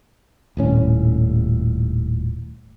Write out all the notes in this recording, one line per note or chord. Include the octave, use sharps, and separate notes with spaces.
D#1 A2 C#4